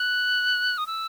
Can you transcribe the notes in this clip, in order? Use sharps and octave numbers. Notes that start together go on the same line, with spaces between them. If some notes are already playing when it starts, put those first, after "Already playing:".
Already playing: F#6
D#6
E6